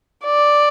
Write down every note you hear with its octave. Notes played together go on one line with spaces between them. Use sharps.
D5